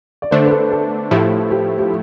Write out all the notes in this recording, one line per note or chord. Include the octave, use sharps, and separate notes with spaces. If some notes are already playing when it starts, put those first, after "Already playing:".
D5
D3 A3 D4 C5
B4
A4
A4
A2 F3 A3 E4 G4
G4
G4